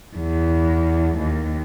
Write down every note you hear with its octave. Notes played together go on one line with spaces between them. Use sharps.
E2
D#2